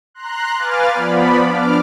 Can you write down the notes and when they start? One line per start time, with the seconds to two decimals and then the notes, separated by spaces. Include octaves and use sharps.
0.14 A#5 C6 F#6
0.56 B4 F5 G#5 D6 F6 A6
0.92 F3 B3 D5 B5
1.46 D4 D6 F6